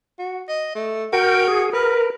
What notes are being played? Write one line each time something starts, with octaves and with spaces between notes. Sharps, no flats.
F#4
D#5
A3
F#4 A#4 G5
G#4
A#4 B4